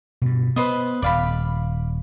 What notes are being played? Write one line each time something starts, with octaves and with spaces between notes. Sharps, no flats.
G2 B2
B3 B4 C5 D#5
D#1 D5 F5 B5